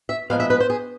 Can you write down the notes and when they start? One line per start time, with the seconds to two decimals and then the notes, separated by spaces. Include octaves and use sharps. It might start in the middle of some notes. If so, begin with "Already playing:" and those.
0.09 E5
0.30 A#2 F3 G#3 B3 F5
0.40 E5
0.50 B4
0.60 C5
0.70 G#4